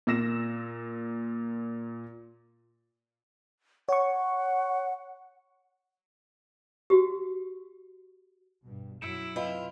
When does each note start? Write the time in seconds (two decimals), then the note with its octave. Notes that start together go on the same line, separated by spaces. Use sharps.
0.07 A#2 E6 A#6 E7
3.89 C#5 F#5 C#6
6.90 F#4 G4
8.64 G2 B2
9.01 F#2 F#3 E4 C#7 D7 E7
9.36 F#2 C3 F4 B4 D#5 B5